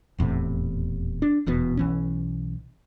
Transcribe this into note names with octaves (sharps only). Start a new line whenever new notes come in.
D#1 E2 A2 C3
D4
D#1 E2 B2 B3
B1 E3 C#4